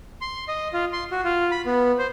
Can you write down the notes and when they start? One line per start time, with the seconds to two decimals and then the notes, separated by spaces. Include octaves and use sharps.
0.21 C6
0.48 D#5
0.73 F4
0.93 C6
1.11 F#4
1.24 F4
1.51 B5
1.66 B3
1.99 C5